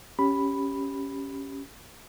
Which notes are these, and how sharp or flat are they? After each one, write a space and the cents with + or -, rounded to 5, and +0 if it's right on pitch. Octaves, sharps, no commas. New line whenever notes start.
C#4 +0 G4 -5 B5 +0